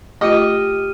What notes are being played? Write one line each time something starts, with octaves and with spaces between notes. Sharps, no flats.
A3 F4 G4 D#5 F6 D#7